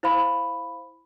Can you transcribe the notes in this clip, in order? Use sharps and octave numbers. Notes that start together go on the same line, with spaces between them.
E4 C5 F5 B5